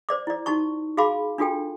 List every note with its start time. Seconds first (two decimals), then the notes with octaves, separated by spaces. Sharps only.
0.09 C5 D5 D6
0.27 E4 D5
0.46 D#4 F#4 A5 C#6
0.97 F#4 G#4 F5 A5 B5 D6
1.38 D4 F4 F#4 A4 G5